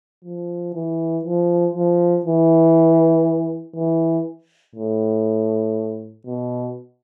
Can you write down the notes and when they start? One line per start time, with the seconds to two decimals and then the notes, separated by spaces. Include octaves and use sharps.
0.25 F3
0.74 E3
1.25 F3
1.75 F3
2.26 E3
3.76 E3
4.76 A2
6.26 B2